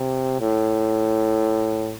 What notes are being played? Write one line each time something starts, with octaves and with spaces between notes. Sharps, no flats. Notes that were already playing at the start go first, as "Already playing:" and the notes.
Already playing: C3
A2